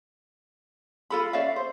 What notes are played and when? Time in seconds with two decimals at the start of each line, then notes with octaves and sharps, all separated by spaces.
1.10 F4 A4 B5
1.33 C#4 D5 E5 F5
1.56 C5